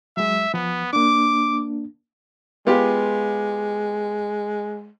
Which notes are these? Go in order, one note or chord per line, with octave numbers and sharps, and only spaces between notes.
F#3 G#3 E5
F3 B3
A#3 D4 D6
G#3 B3 F4 G4